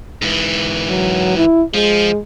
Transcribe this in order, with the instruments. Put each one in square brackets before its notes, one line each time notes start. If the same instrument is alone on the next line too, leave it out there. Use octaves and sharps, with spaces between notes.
[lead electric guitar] G#2 E3
[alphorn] F#3
E4
[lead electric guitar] F3 [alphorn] G#3